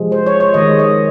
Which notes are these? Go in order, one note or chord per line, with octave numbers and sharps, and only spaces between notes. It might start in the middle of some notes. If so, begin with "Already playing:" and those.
Already playing: C3 F3 G#3
C5
C#5
C#5
D#3 G#3 D#5
D#5